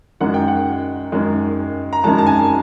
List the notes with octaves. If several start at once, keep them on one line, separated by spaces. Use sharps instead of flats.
F#2 D#3 G#3 F#5
G5
F#5
F#2 D#3 G#3
A#5
F#2 D#3 G#3 A5
A5
G#5